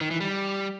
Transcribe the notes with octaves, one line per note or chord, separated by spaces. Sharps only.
D#3
E3
G3